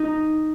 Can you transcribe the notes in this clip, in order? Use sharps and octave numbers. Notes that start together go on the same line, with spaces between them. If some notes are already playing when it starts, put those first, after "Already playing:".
Already playing: D#4